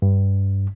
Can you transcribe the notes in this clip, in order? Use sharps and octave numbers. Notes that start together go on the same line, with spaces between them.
G2